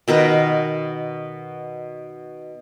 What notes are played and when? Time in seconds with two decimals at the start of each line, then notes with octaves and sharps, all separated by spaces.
0.08 B2 D#3 A#4 B4